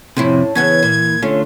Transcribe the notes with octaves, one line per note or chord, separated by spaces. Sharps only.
F2 A2 C3 C#4 E4
C#3 E3 B3 C#4 G#6
A#2
D3 A3 C#4 F4